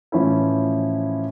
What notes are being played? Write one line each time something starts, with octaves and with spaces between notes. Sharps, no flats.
A2 E3 F3 C#4 E4